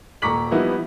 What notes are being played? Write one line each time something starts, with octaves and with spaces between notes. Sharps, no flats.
D#1 A#5 C#6 D6 B6 F#7
E3 F3 G3 B3 D#4 E4